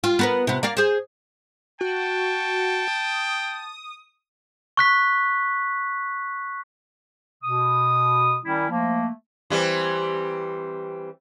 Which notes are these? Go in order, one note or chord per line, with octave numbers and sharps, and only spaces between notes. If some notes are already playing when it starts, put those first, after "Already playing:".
F4
B3 A#4 B4
C3 B3
A#3 D5 F5
G#4 C5
F#4 G5 A5
D#6
C#6 F#6 B6
B2 D#6
D#3 G3 C#4 E4
F3 A3 A#3
E3 G3 C4